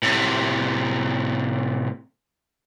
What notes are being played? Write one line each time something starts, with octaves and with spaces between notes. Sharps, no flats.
A2 C3